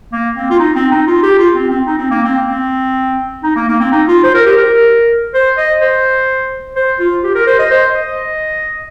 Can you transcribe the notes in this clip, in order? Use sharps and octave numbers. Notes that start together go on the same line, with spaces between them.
A#3
C4
F4
D#4
C4
D#4
F4
G4
F4
C4
C4
D#4
C4
A#3
C4
C4
D#4
A#3
A#3
C4
D#4
F4
C5
A#4
G4
A#4
C5
D#5
C5
C5
F4
G4
A#4
C5
D#5
C5
D#5